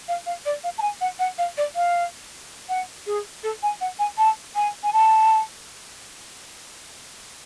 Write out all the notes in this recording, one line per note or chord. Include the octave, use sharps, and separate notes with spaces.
F5
F5
D5
F5
A5
G#5
F#5
F#5
F5
D5
F5
F#5
G#4
A4
G#5
F#5
G#5
A5
G#5
G#5
A5